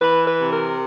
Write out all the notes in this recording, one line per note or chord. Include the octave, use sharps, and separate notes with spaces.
E3 B4
B4
C3
A#4